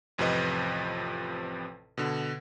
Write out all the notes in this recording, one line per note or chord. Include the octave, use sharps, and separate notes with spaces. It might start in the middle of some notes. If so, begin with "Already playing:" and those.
A1 F2 C3 F3 B4 D#5
B2 D3